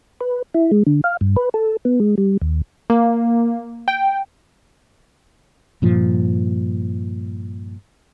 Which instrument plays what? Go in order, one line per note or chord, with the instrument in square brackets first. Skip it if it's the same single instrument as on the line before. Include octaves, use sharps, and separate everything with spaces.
[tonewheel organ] B4
E4
G#3
D3
F5
G2
B4
A4
B3
G#3
G3
D#2
[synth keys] A#3
G5
[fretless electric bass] G2 A#2 F3